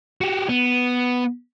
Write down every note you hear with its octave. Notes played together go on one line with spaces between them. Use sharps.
F#4 G4
B3